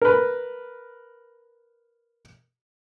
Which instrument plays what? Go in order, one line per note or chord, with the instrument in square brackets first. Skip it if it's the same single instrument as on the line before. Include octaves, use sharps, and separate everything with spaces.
[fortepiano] A#4 B4